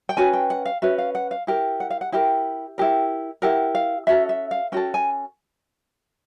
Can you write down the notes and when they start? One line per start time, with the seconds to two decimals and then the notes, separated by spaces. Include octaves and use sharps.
0.09 G5
0.17 C#4 F#4 B4 G#5
0.33 G5
0.50 F#5
0.65 F5
0.82 C#4 F#4 B4 E5
0.98 F5
1.15 F#5
1.31 F5
1.47 E4 G4 A#4
1.80 F#5
1.90 F5
2.01 F#5
2.12 E4 G4 A#4 G5
2.78 E4 G4 A#4
3.42 E4 G4 A#4 F#5
3.75 F5
4.07 C#4 F#4 A4 E5
4.29 E5
4.51 F5
4.72 C#4 F#4 A4 G5
4.94 G#5